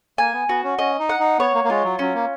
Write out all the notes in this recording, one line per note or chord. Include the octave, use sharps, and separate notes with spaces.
A#3 G#5
B3
B3 F#4
C#4
C#4 D#5
D#4
F#5
D#4
B3 C#5
A#3
A#3
G#3 F4
F#3
F#3 C#4
A#3